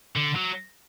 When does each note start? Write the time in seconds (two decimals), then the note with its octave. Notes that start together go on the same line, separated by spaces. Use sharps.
0.16 D3
0.36 F#3